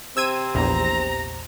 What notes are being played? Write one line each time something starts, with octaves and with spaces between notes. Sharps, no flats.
C3 C4 E6 G#6 D#7
A#1 E2 A#5